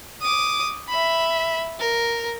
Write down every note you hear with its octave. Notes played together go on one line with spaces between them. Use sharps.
D6 D#6
E5 B5
A#4